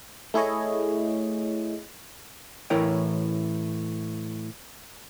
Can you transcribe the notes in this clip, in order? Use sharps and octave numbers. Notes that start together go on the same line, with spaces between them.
A3 E4 G#4 C#5 D#5
A2 E3 E4 A#4 C#5 G5